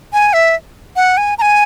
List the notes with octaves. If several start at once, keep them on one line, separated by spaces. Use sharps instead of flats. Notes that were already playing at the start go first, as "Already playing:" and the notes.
G#5
E5
F#5
G#5
A#5
G#5